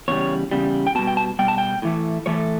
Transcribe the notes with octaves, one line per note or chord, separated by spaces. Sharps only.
E2 C#3 G3 C#5
E2 C#3 G3
G5
B2 G3 A5
G5
A5
B2 G3 G5
A5
G5
A2 E3 A3
A2 E3 A3 C#5